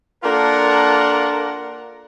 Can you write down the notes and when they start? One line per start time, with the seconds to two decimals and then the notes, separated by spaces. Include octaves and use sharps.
0.23 A#3 D4 F4 A4 A#4 F#5